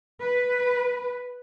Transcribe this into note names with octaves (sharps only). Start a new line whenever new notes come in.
B4